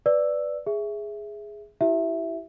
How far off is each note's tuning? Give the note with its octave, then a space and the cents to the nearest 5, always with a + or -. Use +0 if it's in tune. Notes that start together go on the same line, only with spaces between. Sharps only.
B4 +5 D5 +0 E6 +0
G#4 +0 E5 +0
E4 +0 G4 -35 E5 +0